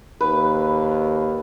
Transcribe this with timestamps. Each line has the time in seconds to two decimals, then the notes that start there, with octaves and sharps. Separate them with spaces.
0.21 D#2 B4